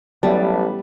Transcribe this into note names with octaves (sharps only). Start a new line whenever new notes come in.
A1 F#3 G3 B3 D5 E5 A5